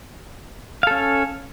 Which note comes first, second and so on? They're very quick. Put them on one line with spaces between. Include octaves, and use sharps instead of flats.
F5 A4 C#4